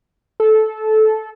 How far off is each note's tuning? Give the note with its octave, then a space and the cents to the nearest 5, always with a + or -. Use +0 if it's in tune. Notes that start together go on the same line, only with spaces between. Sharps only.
A4 -15